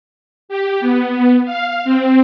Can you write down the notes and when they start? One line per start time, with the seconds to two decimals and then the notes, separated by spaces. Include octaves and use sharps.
0.49 G4
0.80 B3
1.45 F5
1.85 C4